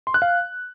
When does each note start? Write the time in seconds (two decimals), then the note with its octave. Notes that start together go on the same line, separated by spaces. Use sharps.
0.07 C6
0.14 F#6
0.22 F5